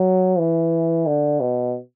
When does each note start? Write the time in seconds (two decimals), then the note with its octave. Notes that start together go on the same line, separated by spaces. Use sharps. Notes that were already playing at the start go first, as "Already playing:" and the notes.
Already playing: F#3
0.39 E3
1.07 D3
1.41 B2